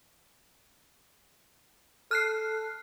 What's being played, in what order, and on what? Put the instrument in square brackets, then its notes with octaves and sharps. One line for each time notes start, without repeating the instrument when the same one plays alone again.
[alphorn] A4 [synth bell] F6 F#6 C7